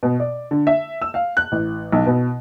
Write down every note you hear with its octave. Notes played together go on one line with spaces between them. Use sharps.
B2
D5
D3
E5
E6
F5
F#6
A1
B1
B2